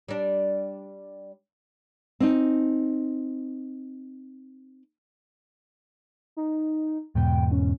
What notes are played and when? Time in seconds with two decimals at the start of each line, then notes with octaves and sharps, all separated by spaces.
0.08 G3 D4
2.20 C4 D#4
6.37 D#4
7.15 E2 G#2 B2 G5
7.51 C#4